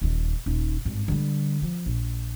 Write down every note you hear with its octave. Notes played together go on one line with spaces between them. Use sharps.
D#1 D#2
D#1 D#4
G#1 G2
D3 G3
F3
A#1